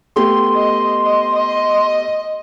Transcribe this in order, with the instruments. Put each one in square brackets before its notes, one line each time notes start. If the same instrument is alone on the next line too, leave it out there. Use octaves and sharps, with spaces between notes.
[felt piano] A3 B3 G4 [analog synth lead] C6
[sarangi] D#5
D#5
D#5